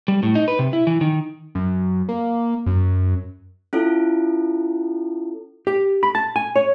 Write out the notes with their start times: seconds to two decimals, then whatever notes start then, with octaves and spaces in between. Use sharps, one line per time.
0.08 G3
0.23 A2
0.35 D#4
0.48 B4
0.59 C3
0.73 E4
0.87 E3
1.01 D#3
1.55 F#2
2.09 A#3
2.66 F#2
3.73 C#4 E4 F4 A4
5.67 G4
6.03 B5
6.15 A5
6.36 G#5
6.56 C#5